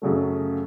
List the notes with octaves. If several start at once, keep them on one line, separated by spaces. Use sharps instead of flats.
F#2 C#3 F#3 A3